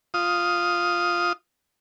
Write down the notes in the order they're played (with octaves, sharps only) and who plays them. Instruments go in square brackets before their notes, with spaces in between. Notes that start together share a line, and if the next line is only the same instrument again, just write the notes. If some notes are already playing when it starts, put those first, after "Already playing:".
[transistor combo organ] F4 D#6